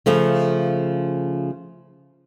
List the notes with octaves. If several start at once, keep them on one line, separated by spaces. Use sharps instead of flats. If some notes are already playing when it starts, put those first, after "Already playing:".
C#3 F3 A3